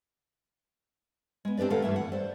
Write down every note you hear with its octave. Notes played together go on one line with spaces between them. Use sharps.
G#3 B3
C4 D4 G4 B4 D5
A2 D#3 A4 B4 F5 F#5
G2 E3 A3 E5
F#5
C5 D5